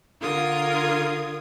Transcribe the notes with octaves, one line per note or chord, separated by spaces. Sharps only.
D3 F4 A#4 D#6 G#6